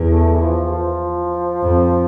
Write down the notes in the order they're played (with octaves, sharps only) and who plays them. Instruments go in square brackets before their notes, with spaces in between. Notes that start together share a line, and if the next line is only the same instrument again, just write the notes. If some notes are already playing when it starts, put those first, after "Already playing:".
Already playing: [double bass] E2
[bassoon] A3
E3
F3
F3
[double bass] F2